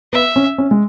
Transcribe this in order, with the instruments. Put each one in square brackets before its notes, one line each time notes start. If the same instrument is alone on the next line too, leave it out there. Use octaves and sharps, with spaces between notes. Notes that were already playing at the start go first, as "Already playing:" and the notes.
[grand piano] B3 [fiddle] E5
[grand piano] C#4
C#4
G#3